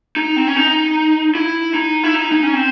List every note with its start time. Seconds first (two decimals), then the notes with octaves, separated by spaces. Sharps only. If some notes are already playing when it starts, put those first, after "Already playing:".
0.16 D#4
0.36 C4
0.47 C#4
0.56 D#4
1.35 E4
1.74 D#4
2.04 E4
2.14 D#4
2.32 D#4
2.43 C#4
2.53 C4